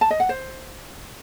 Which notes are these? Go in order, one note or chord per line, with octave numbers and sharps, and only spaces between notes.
A5
D#5
F#5
C5